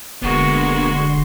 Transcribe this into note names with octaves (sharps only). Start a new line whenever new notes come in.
E1 D3 G#3 A#3 B3 F#4 C6